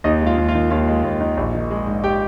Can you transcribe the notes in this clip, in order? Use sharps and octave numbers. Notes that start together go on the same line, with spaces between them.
D#2 D#4 D#5
G#3
F4 F5
D#2
F4 F5
D#3
D#2 F4 F5
G#3
D#2
D#3
A#1
D#3
G#3
G#2
G4 G5